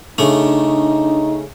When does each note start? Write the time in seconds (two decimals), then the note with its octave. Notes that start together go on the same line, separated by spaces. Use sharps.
0.18 C#3 A3 D4 D#4